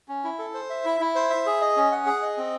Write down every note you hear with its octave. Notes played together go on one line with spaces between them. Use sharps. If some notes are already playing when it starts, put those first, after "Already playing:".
C#4
E4
A4
C5
E5
E4
E4
C5
E5
G#4
D#5
C#4
F#5
G#4
D#5
C4